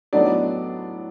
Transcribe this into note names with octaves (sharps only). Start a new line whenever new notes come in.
A2 F#3 B3 D4 D#4 D5